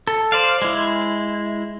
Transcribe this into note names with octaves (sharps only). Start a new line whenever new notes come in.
A4
C5 D5 F5
G#3 E4